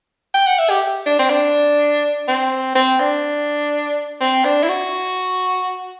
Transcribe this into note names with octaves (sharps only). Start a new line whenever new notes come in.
G5
F#5
E5
G4
D4
C4
D4
C4
C4
D4
C4
D4
E4
F#4